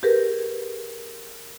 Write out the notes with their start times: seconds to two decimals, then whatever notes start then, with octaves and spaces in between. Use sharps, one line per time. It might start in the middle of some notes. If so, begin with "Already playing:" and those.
0.03 G4 G#4 A#4 B4